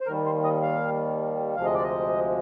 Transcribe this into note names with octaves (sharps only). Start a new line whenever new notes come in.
C5
D#2 D#3 G3 A#4
C5
D#5
F5
D2 C3 F3 G#3 F5
D#5
D5
D#5